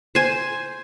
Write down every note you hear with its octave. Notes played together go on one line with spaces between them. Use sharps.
C5 G#5